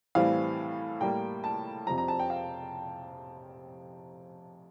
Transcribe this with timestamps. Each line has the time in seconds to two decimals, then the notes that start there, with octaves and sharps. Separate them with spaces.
0.15 A2 E3 G3 C4 F5
1.00 A2 G3 A#3 G5
1.44 A5
1.87 F2 C3 F3 A#5
1.98 A#5
2.08 A5
2.19 G5
2.30 F5